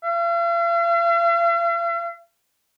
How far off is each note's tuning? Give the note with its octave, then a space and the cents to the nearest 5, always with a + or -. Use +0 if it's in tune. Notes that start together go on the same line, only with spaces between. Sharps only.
F5 -45